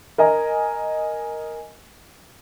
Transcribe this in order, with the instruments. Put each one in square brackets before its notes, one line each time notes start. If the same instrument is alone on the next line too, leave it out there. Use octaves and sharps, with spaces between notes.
[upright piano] A#4 D#5 G#5